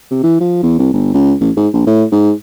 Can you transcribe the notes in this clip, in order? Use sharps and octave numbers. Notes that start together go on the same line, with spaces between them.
C3
E3
F3
E2
C2
G1
C#2
A1
G#2
A#1
A2
G#2